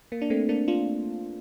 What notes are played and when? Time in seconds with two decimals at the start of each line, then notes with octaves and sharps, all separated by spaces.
0.12 A#3
0.22 D4
0.30 A3 C4
0.49 A#3 D4
0.68 D4 F4